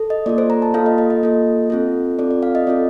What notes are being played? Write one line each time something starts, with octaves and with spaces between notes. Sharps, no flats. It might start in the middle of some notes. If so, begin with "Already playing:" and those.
Already playing: A4
D#5
A#3 F4 A4 D5
C5
A#5
A5
A#3 F4 A4 F5
D#5
D#5
D#5
A#3 F4 A4
C4 F4 A4
C4 F4 A4 D5
D5
F5
D#5
C4 F4 A4 D5